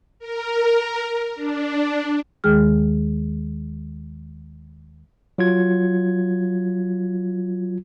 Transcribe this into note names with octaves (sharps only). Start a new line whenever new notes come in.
A#4
D4
D#2 D#3 G#3 G#4 F6
F#3 F4 G#6